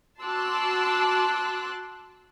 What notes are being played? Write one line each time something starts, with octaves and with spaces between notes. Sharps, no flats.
F#4 A5 C6 D6 E6 F#6